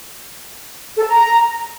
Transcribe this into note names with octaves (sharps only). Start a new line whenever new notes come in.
A4
A5
A#5